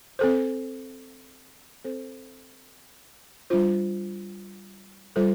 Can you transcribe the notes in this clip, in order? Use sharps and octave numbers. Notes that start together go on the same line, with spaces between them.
C4 A4 C5
C4 A4 C5
G3 D4 F4 C5
G3 F4 A4 C5